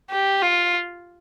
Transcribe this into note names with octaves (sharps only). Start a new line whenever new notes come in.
G4
F4